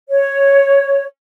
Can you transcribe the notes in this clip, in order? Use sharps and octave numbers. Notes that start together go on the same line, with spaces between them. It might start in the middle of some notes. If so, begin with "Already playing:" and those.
C#5